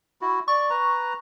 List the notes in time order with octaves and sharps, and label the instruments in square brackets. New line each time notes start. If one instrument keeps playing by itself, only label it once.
[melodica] E4 F#4
[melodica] D5 [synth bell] C#6
[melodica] B4 A#5